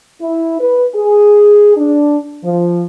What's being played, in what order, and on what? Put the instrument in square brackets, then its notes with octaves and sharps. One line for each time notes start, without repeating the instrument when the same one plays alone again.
[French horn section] E4
B4
G#4
D4
F3